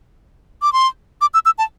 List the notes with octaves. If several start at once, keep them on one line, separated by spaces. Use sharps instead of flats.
D6
C6
D6
E6
E6
A5